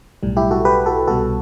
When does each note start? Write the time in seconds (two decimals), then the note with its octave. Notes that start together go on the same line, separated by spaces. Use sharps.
0.23 B1 A2 G3
0.37 E4 G4
0.51 F#4 A4
0.65 G4 B4
0.86 F#4 A4
1.07 C2 B2 G3 F#4 A4